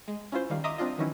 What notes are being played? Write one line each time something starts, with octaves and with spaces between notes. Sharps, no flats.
G#3
C#4 E4 F4 C5
D#3 G3 F5
D#5 E5 A#5 C6 D6 D#6
C4 D4 F4 D#5
D#3 E3 F#3 C#4 D#4 E4